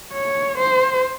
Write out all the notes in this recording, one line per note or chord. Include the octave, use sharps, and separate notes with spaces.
C#5
C5